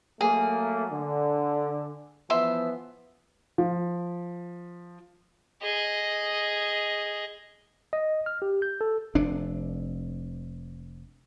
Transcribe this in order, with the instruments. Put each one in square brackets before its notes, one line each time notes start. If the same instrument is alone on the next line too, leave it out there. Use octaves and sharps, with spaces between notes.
[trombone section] F#3 A3 A#3 [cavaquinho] G#4
[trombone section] D3
[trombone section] E3 F3 B3 [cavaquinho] E5 C6
[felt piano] F3
[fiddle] G#4 D#5
[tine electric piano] D#5
F6
G4
G6
A4
[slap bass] F1 C3 D4